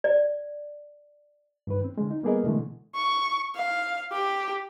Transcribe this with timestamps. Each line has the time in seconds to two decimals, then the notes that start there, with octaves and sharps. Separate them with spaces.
0.04 D5
1.67 G2 D#3 B4
1.84 C4
1.98 D3 G#3
2.11 D#4
2.23 G3 A#3 B3 G#4 A#4 D#5
2.44 B2 D3 E3 G#3 A3
2.96 C#6
3.56 F5
4.12 G4